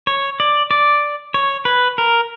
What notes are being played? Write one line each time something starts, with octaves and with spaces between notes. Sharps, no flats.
C#5
D5
D5
C#5
B4
A#4